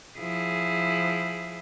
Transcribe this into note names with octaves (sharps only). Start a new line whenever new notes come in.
F3 E4 G#4